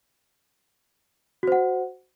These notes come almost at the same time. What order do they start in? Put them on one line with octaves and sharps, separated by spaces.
F#4 C5 F#5